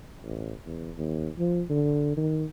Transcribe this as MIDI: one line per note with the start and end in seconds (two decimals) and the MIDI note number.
0.24 0.52 33
0.66 0.90 40
0.98 1.28 39
1.39 1.62 53
1.70 2.13 50
2.17 2.44 51